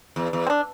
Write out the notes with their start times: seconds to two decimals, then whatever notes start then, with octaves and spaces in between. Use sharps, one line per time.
0.16 E2
0.33 E2
0.47 C4
0.50 D4